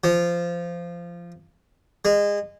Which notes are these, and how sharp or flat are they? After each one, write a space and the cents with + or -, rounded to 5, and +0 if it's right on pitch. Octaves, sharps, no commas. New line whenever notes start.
F3 -15
G#3 -25